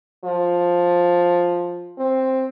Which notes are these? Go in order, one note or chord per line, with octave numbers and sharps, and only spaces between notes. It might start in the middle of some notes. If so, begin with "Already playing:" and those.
F3
C4